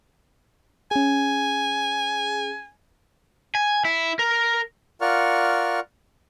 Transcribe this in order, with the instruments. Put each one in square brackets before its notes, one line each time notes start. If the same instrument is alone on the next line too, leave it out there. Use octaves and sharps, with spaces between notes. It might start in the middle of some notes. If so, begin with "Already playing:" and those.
[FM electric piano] C#4 G#4 [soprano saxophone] G#5
[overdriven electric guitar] G#5
E4
A#4
[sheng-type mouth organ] F4 A#4 D5 F#5 C#6 F6